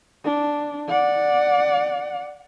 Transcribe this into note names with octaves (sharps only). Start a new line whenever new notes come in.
D4
D5 F#5